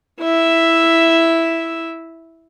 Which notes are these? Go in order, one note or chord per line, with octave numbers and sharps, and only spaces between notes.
E4 E5